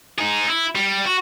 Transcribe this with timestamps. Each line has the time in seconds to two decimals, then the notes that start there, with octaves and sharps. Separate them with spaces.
0.19 D#4 G#4
0.48 E4
0.75 G3
1.05 F#4